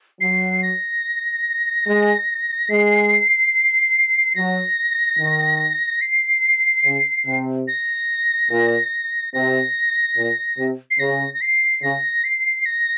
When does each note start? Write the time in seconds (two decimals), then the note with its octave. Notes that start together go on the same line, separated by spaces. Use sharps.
0.21 F#3 C7
0.63 A#6
1.86 G#3
2.69 G#3 C7
4.36 F#3 A#6
5.19 D#3
6.01 C7
6.84 C#3
7.26 C3
7.68 A#6
8.51 A#2
9.33 C3 A#6
10.17 A#2
10.58 C3
10.91 C7
10.99 C#3 A#6
11.34 A#6
11.41 C7
11.82 C#3 A#6
12.24 C7
12.65 A#6